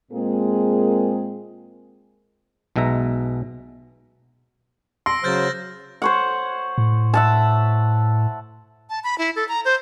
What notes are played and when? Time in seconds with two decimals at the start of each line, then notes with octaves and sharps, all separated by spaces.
0.12 A#2 G#3 A#3 C4 G#4
2.76 B1 B2 G#3 E5 A#5
5.06 C6 E6 A#6 D7
5.24 C#3 F#3 C5 F6 G6 A6
6.02 C5 C#5 F#5
6.78 A2
7.14 E5 F#5 A5
8.90 A5
9.04 B5
9.18 E4
9.36 A4
9.48 A#5
9.65 C5